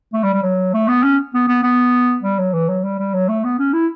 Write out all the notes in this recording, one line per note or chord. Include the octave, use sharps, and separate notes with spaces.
A3
G3
G3
F#3
A3
B3
C#4
B3
B3
B3
G3
F#3
E3
F#3
G3
G3
F#3
A3
B3
C#4
E4